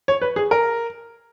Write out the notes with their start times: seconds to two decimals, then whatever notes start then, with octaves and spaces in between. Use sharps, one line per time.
0.08 C#5
0.22 B4
0.36 G#4
0.51 A#4